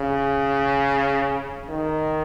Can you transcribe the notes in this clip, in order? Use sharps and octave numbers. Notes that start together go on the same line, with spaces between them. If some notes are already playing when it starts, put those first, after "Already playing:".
Already playing: C#3
D#3